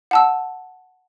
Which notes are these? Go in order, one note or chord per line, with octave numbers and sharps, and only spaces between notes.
F#5 A5 E6